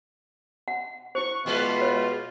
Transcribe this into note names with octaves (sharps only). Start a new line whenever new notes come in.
F#5
E4 C5 C#6
B2 G3 G#3 F4 B4
C#5